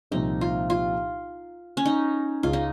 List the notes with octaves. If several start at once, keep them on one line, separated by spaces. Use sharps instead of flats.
C2 A#2 F3 C4 D#4
F4
F4
C#4
D#4
C#2 C#3 G#3 F4
D#4